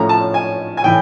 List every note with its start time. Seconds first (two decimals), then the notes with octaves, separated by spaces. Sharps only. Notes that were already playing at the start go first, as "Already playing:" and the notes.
Already playing: A2 F3 A3 C#4 A#5
0.09 A5
0.34 G#5
0.77 G#5
0.84 A2 E3 G5